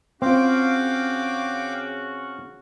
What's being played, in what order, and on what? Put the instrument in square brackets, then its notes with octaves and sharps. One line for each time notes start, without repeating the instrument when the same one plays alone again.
[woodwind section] C#3 C#4 F#4 [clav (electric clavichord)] C4 F4 [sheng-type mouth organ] F5 G5 D6